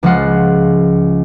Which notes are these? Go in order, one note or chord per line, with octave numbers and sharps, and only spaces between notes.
C#2 F3 G#3 F4 F#5 C7